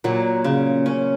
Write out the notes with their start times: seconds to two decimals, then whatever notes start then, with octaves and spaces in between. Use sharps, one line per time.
0.04 A#2 F#3
0.44 C#3
0.86 C#4